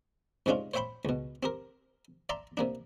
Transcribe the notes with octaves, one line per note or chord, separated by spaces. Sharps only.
G#2 C3 G#3 C#4 D4 F4
C5 C#5 E5 G5 B5 C6
C#2 B2
C4 G4 A#4
D5 E5 A5 A#5 C6
C3 A#3 D4